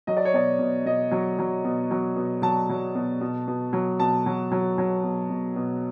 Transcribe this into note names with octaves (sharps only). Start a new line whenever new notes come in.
F#3 D#5
D5
C#5
B2 D5
B2
B2 D#5
F#3
F#3
B2
F#3
B2
F#3 A5
F#3
B2
B2
B2
F#3
B2 A5
F#3
F#3
F#3
B2
B2
B2